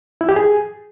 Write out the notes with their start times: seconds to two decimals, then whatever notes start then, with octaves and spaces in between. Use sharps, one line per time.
0.21 E4
0.29 G4
0.36 G#4